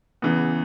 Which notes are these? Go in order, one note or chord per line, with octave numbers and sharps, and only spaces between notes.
E2 C#3 E3 B3